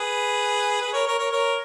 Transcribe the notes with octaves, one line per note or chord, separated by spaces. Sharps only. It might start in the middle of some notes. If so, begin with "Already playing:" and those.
Already playing: G#4 B4
G#4 B4
A#4 C#5
A#4 C#5
A#4 C#5
A#4 C#5